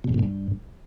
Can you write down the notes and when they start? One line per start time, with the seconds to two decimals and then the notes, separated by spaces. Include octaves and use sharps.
0.04 B2
0.09 F2
0.14 A#2
0.19 G2